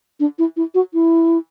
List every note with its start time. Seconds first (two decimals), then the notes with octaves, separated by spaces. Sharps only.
0.20 D4
0.39 E4
0.57 E4
0.74 F#4
0.94 E4